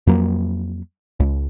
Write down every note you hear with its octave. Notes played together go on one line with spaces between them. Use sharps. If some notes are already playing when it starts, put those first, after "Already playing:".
F2 F#3 A#3
C#2